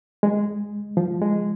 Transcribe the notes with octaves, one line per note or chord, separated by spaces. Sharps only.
G#3
F3
G#3